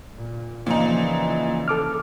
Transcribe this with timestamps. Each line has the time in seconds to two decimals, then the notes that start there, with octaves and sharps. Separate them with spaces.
0.14 A#2
0.66 A#2 C#3 E3 F3 D#4
1.68 A4 D6 F6